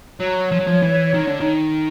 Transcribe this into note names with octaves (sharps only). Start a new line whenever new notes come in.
F#3 C#5
F3
F#3
F3
E3
D#3
D3
D#3